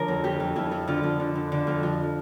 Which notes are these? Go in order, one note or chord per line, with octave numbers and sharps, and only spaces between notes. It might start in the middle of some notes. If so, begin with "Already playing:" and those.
Already playing: D3 F3 A#4 C#5
F2
F2 G4
F2
F2 E4
F3
D3 F4
F2
D3
D3
D3
F2
F3